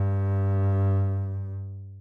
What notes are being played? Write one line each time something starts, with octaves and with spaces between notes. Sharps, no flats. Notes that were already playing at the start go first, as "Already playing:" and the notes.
Already playing: G2